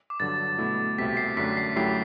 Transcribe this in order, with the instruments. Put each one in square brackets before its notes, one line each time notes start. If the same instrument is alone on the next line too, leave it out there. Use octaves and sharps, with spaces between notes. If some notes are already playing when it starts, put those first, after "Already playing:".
[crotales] D6
[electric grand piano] G2 D3 F#3 [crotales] A6
[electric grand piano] B2 A3 E4
[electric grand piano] C2 B2 A3 C4 G4 [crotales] B6
[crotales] C7
[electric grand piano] F#2 D3 A3 [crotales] B6
[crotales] C7
[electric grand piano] F#2 F#3 A3 E4 G4 [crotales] C7